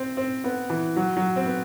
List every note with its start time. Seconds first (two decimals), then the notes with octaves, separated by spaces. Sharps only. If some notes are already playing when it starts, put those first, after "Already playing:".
Already playing: C4
0.17 C4
0.44 B3
0.70 E3
0.96 F#3
1.17 F#3
1.36 C4
1.46 B3